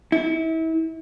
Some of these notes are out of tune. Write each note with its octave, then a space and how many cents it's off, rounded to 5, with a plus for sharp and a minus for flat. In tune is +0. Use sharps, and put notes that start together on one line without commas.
E4 -35